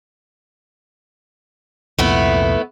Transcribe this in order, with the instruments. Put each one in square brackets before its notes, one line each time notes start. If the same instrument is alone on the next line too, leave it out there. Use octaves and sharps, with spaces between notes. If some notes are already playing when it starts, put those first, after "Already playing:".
[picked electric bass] C2 F2 A#2 [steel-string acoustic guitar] A3 B3 E4